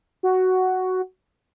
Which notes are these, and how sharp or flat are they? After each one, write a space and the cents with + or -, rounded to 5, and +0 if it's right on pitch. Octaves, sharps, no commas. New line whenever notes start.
F#4 +5